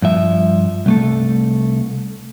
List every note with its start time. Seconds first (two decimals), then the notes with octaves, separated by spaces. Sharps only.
0.02 G2 F3 E5
0.86 C2 A3 A4